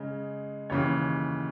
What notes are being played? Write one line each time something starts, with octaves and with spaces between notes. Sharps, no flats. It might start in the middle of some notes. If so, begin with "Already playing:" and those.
Already playing: C#3 G#3
D#2 C#3 E3 C#5